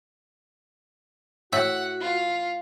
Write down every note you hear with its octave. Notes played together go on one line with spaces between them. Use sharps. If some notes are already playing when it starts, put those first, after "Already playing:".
A2 F#4 E5 F#5
F4